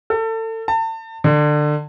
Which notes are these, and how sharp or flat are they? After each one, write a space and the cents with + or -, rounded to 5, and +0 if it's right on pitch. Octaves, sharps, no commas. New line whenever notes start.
A4 +30
A5 +35
D3 +25